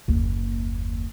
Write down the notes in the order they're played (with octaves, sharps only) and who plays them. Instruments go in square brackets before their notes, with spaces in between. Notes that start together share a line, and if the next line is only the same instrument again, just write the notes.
[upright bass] F#1 D#2